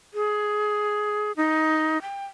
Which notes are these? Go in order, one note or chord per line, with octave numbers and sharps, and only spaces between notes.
G#4
D#4
G5